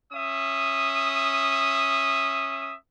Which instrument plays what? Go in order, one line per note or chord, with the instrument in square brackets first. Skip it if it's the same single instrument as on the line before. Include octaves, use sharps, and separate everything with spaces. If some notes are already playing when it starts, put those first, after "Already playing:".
[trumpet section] C#4 E5 D#6